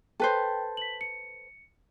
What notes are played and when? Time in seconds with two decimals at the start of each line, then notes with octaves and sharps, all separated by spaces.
0.20 A4 B4 C5 G5
0.77 B6 F#7
1.01 C#7